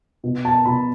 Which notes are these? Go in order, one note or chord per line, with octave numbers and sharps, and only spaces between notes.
B2
A5
B2 B5